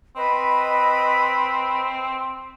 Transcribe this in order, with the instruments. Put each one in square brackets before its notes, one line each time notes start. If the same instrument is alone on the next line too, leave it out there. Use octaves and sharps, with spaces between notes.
[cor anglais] C4 [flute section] B4 D#5 B5